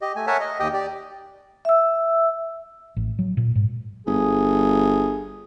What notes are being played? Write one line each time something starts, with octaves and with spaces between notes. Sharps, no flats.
G4 D#5
A3 G#5
A#4 C#5 E5 F#5 G#5 A5
D#5
D#2 G4 D#5 G5 D#6
G4 D5
E5 E6
A1
F#3
A#2
G#2
G1 G#4